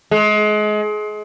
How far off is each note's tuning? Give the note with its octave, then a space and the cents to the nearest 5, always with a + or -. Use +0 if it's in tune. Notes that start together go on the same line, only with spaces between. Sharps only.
G#3 +30